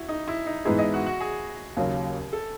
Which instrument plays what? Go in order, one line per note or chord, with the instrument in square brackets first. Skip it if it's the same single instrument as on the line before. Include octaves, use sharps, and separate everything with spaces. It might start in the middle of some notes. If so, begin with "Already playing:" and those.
Already playing: [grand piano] E4 F#4
D#4
E4
D#4
[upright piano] G#2 E3 B3 D#4 G#4 [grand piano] E4
[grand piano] D#5
F#4
F#4
G#4
[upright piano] D#2 C#3 F#3 C#4
[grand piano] A4